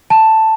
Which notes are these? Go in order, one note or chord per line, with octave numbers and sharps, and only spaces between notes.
A5